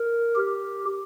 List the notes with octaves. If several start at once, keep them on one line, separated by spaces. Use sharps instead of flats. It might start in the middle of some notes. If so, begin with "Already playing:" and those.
Already playing: A#4
G4